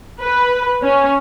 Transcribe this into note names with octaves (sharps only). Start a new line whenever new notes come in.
B4
C#4